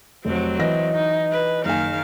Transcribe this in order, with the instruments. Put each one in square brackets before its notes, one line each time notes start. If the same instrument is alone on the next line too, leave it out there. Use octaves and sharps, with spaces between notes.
[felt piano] F1 [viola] F#3 C4
[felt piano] E3 A#6 [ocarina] D#5
[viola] D#4
B4
[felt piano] F#1 G#5 [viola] D#3 F5